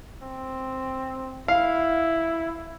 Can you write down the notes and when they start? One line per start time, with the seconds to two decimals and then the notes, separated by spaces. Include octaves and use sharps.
0.22 C4
1.48 E4 F5